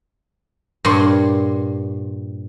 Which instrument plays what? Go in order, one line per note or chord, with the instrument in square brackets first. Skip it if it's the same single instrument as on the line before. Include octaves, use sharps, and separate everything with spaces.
[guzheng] G2 A#2 C#5 C6